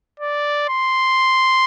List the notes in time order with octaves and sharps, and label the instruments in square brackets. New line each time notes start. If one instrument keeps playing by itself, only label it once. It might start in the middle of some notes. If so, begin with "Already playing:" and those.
[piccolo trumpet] D5
C6